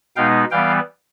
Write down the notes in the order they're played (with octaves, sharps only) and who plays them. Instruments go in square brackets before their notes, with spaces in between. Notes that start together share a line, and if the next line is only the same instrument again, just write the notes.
[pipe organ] B2 G#3 B3 D#4 F5 G5
E3 G3 B3 F5 G5